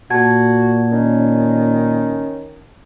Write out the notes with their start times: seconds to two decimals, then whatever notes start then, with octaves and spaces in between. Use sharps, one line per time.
0.10 A#2 F#4 A5 G#6
0.92 D#3 C#4